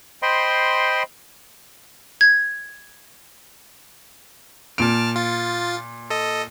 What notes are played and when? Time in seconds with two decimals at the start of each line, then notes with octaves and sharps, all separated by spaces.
0.22 C5 D#5 G5 B5 C6
2.21 G#6
4.78 A#2 A5 F6 D7
5.16 F4 A6
6.10 A4 D#5